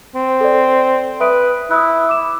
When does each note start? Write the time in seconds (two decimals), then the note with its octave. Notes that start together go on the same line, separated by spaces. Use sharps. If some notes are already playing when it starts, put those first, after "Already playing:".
0.15 C4
0.41 A4 D5
1.20 B4 E5 D#6 D7
1.71 E4 D#6 F#6
2.09 D6 E7